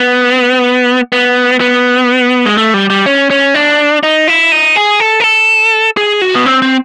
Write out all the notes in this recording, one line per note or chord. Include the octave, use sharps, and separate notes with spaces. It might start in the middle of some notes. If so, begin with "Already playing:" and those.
Already playing: B3
B3
B3
G#3
A3
G3
G3
C#4
C#4
D4
D#4
E4
D#4
G#4
A4
A#4
A4
G#4
F#4
B3
C4
C4